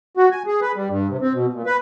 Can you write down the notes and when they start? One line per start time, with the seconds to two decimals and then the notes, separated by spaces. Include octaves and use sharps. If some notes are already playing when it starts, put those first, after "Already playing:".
0.17 F#4
0.31 G#5
0.47 G#4
0.62 B4
0.76 G3
0.90 G2
1.10 C3
1.21 C4
1.34 B2
1.53 A#2
1.66 B4